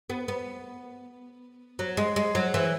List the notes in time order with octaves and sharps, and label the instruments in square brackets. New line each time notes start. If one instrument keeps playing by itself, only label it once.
[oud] B3
B3
F#3
G#3
G#3
F#3
E3